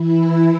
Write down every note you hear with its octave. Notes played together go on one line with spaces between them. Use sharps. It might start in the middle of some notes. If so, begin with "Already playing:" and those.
Already playing: E3 E4